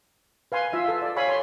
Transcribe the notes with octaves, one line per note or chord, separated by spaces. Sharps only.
B4 F5 G#5 C6
F4 E5 F5
A4
D5
C#5 F5 G#5 B5 C#6
C#5 C6